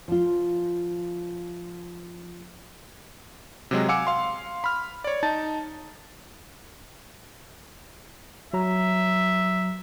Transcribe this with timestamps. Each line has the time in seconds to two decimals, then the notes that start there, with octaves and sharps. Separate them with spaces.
0.08 F3 F4
3.71 C3 F#3 G#3
3.89 F5 F#5 G#5 D6 E6 C#7
4.07 F5 C6
4.64 B5 F6
5.04 C#5 D5
5.23 D#4 A5 A6
8.53 F#3 E5 A#5